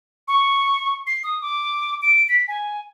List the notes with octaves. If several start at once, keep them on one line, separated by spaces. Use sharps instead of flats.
C#6
C7
D#6
D6
D7
B6
G#5